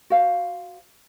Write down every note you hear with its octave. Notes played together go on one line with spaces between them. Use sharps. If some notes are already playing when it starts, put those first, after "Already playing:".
F#4 C5 F5